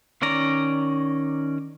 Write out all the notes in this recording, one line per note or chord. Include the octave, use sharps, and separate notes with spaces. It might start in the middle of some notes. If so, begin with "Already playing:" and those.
D#3 C#4 D5 A#5